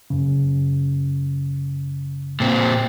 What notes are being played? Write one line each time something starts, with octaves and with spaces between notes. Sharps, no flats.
F#2 C#3
A#2 C4